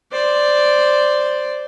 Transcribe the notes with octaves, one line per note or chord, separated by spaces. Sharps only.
C5 D5